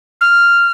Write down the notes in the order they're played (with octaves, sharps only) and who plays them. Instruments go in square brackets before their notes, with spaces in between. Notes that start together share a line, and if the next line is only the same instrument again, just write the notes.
[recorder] F6